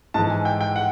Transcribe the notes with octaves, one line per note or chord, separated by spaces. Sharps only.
G#2 E3 A5
G#5
G5
G5
F#5